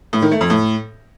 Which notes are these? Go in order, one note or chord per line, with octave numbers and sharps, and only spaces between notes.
A2
D#3
A3
F2
A2